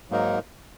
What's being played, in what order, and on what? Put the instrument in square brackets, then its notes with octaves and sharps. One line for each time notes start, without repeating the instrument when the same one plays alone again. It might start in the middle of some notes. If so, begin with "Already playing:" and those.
[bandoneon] G#2 F#3 A#3 D#4 A#4